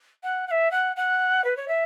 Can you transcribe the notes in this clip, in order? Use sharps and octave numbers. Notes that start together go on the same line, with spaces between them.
F#5
F#5
E5
F#5
F#5
B4
C#5
E5